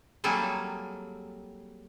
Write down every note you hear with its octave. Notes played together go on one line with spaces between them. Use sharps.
F#3 G3 A#3 C4 G#4 A4